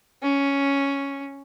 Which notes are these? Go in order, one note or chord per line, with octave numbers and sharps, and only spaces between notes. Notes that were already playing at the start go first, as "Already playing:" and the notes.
C#4